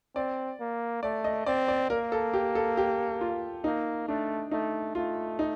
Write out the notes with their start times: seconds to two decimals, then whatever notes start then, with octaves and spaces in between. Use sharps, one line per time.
0.16 C4 D5
0.60 A#3
1.03 A3 D5
1.24 D#5
1.46 C4 D5
1.68 D5
1.90 A#3 A#4
2.12 A4
2.34 G4
2.55 A4
2.77 G4
3.21 F4
3.64 A#3 D#4
4.08 A3 D4
4.51 A3 D#4
4.95 A3 F4
5.39 D#4